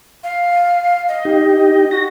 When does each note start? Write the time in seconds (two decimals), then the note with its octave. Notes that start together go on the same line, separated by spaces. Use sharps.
0.24 F5
1.08 D#5
1.25 D#4 G4
1.91 F#4 A#6